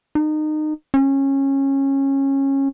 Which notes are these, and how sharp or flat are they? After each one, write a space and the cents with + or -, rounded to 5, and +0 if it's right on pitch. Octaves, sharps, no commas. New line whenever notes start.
D#4 -25
C#4 -20